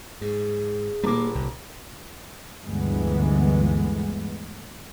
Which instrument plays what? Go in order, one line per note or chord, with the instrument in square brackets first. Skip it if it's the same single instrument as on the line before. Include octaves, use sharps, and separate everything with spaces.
[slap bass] G#2 [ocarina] G#4
[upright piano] D#1 D6 [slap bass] A3 A#3
[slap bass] C2
[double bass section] G1 D2 E3 G#3 B3